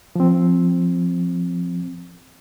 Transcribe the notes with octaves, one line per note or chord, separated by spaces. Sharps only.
F3 C4